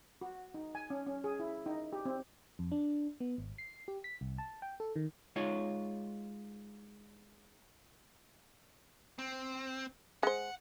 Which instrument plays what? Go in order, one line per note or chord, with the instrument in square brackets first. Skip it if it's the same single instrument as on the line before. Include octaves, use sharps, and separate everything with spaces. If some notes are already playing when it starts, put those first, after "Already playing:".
[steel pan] F#4
D#4
G#5
C#4
C#4
G#4
E4
D#4
G4
C4
[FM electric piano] F2
D4
B3
G#1
C7
G4
B6
C2
A5
G5
A4
D#3
[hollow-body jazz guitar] G#3 D#4 F4 C#5
[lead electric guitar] C4
[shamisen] G#3 C5 [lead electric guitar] F#5